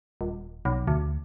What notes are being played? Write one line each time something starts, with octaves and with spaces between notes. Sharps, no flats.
D#1
B1
D2